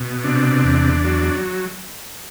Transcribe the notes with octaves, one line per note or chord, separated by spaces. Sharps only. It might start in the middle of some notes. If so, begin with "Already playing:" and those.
Already playing: B2
C3 D4
E2
F#3